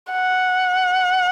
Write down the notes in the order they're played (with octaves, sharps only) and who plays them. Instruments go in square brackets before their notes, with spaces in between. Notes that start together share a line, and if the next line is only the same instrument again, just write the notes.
[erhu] F#5